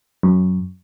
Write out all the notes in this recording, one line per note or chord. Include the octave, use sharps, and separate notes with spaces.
F#2